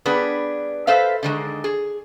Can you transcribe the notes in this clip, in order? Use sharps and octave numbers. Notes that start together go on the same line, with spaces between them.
G3 B3 D4 G#4 B4
A4 B4 C5 E5 F5
D3 D#3 G#3
G#4